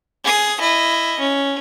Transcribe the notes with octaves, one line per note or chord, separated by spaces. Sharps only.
G#4 D#6
E4 D#5
C#4